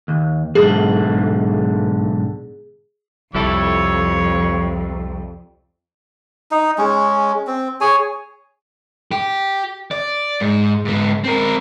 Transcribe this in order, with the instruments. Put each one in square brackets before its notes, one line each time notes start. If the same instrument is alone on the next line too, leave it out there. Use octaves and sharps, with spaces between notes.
[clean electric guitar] D#2
[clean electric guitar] B1 G#2 D3 [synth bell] G#4
[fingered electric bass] C2 [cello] F2 [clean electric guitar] G3 E4 A4 [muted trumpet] C#5
[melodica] D#4
G#3 C#4
C4
G#4 C#5 G#5
[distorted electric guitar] G4
D5
G#2
G#2 B3
C4 A#4